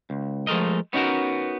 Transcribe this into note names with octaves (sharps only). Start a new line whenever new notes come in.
C#2
F3 G#3 A3 A#4 D#5
B3 C#4 D#4 F#4 A#4